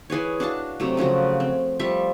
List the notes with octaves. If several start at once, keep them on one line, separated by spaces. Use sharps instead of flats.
E3 G#4 B4 C#5
D4 F#4 F5 A5
C3 F#3 A3
C#3 F3 F#3 F#4
C4
F3 G3 E5 C#6